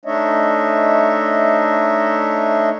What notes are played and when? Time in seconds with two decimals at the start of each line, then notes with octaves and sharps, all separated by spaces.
0.05 A3 D4 D#4 C#5 D#5 E5